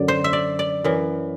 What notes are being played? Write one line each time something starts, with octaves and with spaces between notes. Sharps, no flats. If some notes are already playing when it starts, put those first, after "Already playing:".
Already playing: F#2 D3 D5
C5
E5
D5
D5
F#2 E3